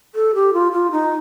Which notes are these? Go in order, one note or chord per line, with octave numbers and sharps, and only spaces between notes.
A4
G4
F4
F4
D#4